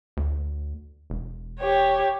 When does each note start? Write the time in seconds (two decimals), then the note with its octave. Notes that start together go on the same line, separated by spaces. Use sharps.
0.17 D2
1.10 E1
1.60 G4 C#5